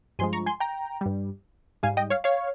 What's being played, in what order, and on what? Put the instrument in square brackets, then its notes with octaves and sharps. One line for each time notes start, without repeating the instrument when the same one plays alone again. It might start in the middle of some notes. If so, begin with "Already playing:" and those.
[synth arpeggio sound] G2 F3 G#3 G#5 C6
A#5 C#6
G#5 C6
G5 A#5
G2 G3
G#2 G3 F5 G#5
D#5 G5
C#5 F5
C#5 F5